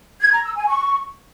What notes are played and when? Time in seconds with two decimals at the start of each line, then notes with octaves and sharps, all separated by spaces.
0.20 G#6
0.32 A#5
0.44 E6
0.55 G#5
0.67 C#6